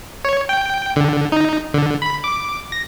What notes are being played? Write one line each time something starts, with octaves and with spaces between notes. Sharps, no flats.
C#5
G5
D3
D#4
D3
B5
D6
A#6